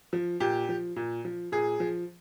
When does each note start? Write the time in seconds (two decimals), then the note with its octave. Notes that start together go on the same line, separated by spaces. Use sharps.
0.13 F3
0.40 A#2 G4
0.69 F3
0.96 A#2
1.25 F3
1.52 A#2 G#4
1.80 F3